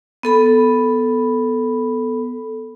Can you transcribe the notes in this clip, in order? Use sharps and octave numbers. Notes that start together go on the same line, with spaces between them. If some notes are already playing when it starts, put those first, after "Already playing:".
B3 A4 B5